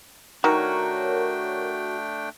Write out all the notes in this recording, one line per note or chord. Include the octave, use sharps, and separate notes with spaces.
D#3 A3 D4 F#4 A#4 C#5 G5